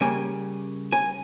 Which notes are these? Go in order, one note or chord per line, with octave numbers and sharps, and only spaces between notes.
C#3 G3 A#3 G#5
G#5